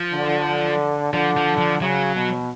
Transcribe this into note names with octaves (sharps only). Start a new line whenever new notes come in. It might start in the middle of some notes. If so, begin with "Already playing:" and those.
Already playing: F3
D3
D3 F3
F3
F3
C#3 F#3
B2